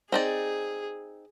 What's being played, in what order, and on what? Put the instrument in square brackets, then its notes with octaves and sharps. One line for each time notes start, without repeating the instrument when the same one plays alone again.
[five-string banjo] C4 D#4 D5 [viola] G#4